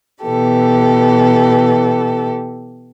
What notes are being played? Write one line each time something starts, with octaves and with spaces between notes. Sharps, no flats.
B2 E3 G4 A4